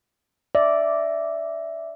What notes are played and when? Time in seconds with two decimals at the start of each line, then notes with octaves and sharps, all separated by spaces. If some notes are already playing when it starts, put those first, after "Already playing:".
0.55 D5 E5